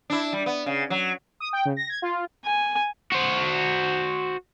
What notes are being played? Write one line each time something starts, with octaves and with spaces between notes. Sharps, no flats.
D4 E4
G3
B3
C#3
F#3
D#6
G5
C#3
A#6
G#6
F4
G#5
F#4 C5